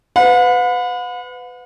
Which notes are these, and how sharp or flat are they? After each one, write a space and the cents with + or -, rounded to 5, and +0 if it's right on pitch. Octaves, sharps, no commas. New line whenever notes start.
B4 +25 F#5 -45